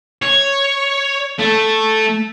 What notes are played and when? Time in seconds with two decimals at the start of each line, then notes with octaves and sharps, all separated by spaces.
0.22 C#5
1.39 A3